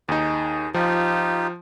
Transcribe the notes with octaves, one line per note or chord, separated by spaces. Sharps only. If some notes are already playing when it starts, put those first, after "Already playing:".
D#2 D#4 G#4
F3 D#4 F4 G4